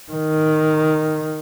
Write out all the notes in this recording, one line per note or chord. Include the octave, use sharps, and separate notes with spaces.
D#3